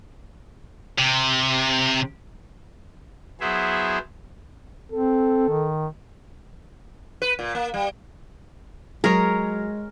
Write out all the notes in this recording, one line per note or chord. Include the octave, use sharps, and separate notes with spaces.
C3
F#3 B3 E4 G#4 C5 E5
C4 A4
D#3
B4
A#2
A#3
G3
F#3 G#3 G#4 A#4 C#5